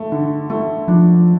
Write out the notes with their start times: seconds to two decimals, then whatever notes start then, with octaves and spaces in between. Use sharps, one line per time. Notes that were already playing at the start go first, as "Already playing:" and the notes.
Already playing: A3
0.12 D3
0.50 A3
0.88 F3 D4